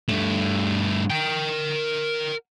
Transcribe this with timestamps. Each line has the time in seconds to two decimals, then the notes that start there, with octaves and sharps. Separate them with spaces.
0.08 G2 A3
1.10 A#4 G5